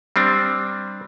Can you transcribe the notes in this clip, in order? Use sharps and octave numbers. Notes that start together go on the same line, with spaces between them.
G3 C4 D4